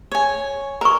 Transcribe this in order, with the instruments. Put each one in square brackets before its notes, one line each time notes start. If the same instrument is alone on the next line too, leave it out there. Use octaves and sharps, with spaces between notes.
[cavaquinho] C#5 G#5
[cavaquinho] A#4 [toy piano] A#5 C#6